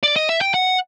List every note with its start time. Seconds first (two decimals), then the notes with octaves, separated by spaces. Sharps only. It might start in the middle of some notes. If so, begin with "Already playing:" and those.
0.03 D5
0.16 D#5
0.29 E5
0.41 G5
0.54 F#5